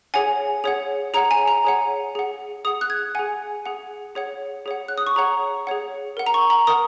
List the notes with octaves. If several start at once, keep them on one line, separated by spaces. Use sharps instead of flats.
G#4 C#5 F#5 G#5
G#4 C#5 F#5
G#4 C#5 F#5 A#5
G#5
A#5
G#4 C#5 F#5
G#4 F#5
G#4 F#5 D#6
F#6
G#6
G#4 F#5 G#5
G#4 F#5
G#4 C#5 F#5
G#4 C#5 F#5
F#6
D#6
C#6
G#4 C#5 F#5 A#5
G#4 C#5 F#5
A#4 F#5
A#5
C#6
A#5
A#4 F#5 D#6